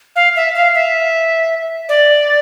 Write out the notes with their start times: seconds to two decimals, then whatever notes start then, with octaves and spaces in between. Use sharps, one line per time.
0.16 F5
0.36 E5
0.55 F5
0.74 E5
1.89 D5